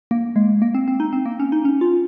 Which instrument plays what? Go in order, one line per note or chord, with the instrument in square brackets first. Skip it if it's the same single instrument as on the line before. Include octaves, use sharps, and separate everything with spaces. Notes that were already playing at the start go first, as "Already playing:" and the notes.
[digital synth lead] A#3
G#3
A#3
C4
C4
D#4
C4
A#3
C#4
D#4
C#4
F4